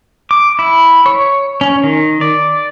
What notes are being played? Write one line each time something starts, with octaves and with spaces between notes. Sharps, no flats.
D6
E4
C#5
C#4
D#3
D5